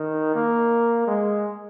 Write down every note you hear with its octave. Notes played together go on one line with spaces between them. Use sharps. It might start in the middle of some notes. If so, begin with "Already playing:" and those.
Already playing: D#3
A#3
G#3